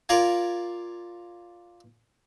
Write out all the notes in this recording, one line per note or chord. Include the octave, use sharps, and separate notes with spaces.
F4 A#4 D5 F5 G#5